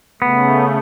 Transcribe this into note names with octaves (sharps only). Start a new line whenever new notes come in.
C#3 A3 B3